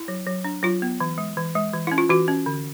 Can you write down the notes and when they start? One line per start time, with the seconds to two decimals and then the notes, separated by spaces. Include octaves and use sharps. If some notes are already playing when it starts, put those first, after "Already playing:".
Already playing: E4
0.08 F#3
0.26 F#3
0.44 D4
0.63 F#3 F4
0.82 B3
1.00 E3
1.18 G#3
1.37 E3
1.55 G#3
1.73 E3
1.87 C#4 E4
1.98 F4
2.10 E3 F#4
2.28 C#4
2.46 D3